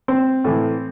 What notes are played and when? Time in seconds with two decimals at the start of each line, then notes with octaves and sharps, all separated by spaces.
0.08 C4
0.44 A2 E3